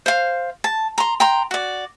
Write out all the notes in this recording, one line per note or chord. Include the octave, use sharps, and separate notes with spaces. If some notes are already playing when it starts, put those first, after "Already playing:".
C5 F5
A5
A#5 C6
G5 A#5 C6
F#4 D5